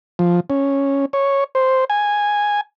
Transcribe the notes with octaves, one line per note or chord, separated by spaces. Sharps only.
F3
C#4
C#5
C5
G#5